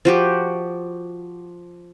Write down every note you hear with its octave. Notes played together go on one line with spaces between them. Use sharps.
F3 F#4 G4